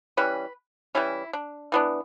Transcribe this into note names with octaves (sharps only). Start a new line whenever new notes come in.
E3 G3 C#4 B4
E3 G3 C#4 E4
D4
E3 B3 D4